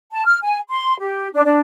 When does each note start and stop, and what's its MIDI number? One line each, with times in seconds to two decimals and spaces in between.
0.12 0.24 81
0.26 0.38 89
0.42 0.59 80
0.70 0.94 84
0.99 1.28 67
1.33 1.41 62
1.45 1.59 62